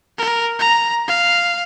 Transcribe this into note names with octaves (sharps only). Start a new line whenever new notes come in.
A#4
A#5
F5